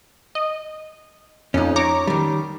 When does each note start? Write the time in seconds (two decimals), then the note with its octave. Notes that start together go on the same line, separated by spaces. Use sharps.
0.35 D#5
1.54 F2 C#4 D#4
1.76 C#5 A#5 D6
2.07 D#3 G3